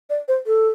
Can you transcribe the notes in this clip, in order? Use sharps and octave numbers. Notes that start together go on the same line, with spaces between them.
D5
C5
A4